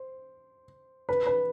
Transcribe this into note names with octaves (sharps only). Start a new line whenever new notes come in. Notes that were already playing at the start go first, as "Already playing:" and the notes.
Already playing: C5
B4
B4